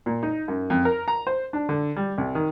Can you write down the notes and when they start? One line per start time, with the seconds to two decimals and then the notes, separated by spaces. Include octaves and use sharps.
0.06 A#2
0.23 D#4
0.48 F#2
0.70 F2
0.85 A#4
1.08 A#5
1.27 C5
1.53 D4
1.69 D3
1.96 G3
2.18 C2
2.35 D#3